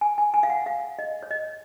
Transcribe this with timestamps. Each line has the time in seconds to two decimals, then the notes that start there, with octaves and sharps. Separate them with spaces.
0.01 G#5
0.18 G#5
0.34 G#5
0.43 F5
0.50 F#5
0.66 F5
0.99 D#5
1.23 C#5
1.31 D#5